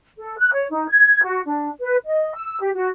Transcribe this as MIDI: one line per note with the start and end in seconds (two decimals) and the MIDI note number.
0.16 0.34 69
0.37 0.50 90
0.52 0.66 73
0.70 0.87 63
0.89 1.21 92
1.23 1.41 66
1.45 1.69 62
1.80 1.96 71
2.04 2.32 75
2.33 2.57 88
2.60 2.69 67
2.74 2.87 66